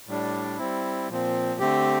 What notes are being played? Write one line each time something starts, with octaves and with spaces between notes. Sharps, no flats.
A2 G3 D4
G3 C4 E4
A#2 F3 C4
D3 A3 C4 G4